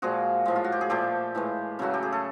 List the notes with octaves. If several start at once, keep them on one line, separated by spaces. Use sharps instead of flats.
A#2 F3 G#3 F#4 G#4
A2 F3 G#3
F4
F#4
G4
G#4
A#2 F3 A3 G4 A4
A2 E3 G#3
C#3 F#3 A3 F#4
G4
G#4
A4